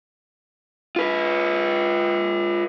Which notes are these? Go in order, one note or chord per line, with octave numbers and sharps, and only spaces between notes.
F4 B4